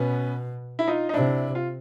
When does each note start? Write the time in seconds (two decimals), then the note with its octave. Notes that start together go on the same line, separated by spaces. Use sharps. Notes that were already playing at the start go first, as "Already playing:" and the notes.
Already playing: B2 B3 C#4
0.79 E4
0.88 D#4 F4
1.09 D#4
1.14 C3 D4 E4
1.55 F4